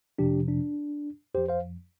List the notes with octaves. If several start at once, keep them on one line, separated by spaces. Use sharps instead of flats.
F2 C3 F3 D4 G4
D4
F2 F3 G4 C5
C5 F5